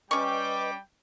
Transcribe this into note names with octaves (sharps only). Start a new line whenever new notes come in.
G3 C#4 B4 D#5 G5 C#6 D6